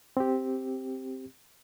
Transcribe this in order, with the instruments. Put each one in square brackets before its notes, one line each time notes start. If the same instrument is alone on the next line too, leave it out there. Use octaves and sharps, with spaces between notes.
[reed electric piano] C4 G4